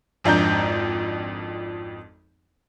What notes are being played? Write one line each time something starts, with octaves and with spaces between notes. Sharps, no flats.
G#1 F2 D4 A#5 G6